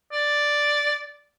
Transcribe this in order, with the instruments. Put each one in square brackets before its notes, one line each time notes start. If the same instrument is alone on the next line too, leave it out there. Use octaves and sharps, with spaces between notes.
[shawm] D5